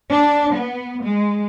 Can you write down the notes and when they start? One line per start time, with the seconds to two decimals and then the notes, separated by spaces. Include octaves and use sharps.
0.10 D4
0.52 B3
1.03 G#3